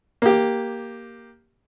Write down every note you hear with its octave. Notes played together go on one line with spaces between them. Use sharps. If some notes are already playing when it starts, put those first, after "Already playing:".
A#3 G4